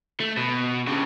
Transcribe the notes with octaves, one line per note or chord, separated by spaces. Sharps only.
A3
B2
G2 C#3